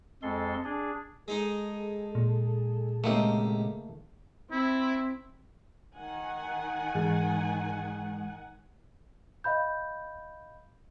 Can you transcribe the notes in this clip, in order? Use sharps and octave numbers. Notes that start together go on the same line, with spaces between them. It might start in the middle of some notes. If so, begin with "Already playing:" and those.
F2 G#3 A4 C6
D4 G#4
G#3 D#4 G#4 A4
A#2
C#2 C3 A3 A#3 D#4
C4 E4
D#3 F#5 G#5
G#2 E3 G#3
D#5 F5 B5 G6